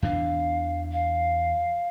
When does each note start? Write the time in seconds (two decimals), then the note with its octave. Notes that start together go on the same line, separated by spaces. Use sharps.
0.02 E2 E3 D4 F5
0.92 F5